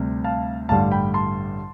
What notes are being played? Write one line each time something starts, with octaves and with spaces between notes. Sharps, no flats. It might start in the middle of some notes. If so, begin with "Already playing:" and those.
Already playing: D2 C3 G3
F5 A5
A1 G2 D3 G3 F5 A5
G5 B5
A5 C6